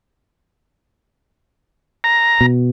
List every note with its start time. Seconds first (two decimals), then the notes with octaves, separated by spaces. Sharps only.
2.04 A#5
2.41 B2